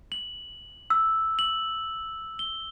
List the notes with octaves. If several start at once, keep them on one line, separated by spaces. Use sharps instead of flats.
F#7
E6
F#7
G7